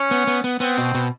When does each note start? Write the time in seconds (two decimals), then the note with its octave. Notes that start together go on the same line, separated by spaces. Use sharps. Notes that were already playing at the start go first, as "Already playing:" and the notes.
Already playing: C#4
0.11 B3
0.27 B3
0.44 B3
0.60 B3 C4
0.78 B2
0.95 B2